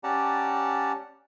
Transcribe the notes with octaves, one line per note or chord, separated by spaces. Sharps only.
C#4 G4 D5 F#5 A5 A#5